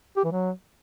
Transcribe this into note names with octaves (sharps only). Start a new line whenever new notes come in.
G4
E3
F#3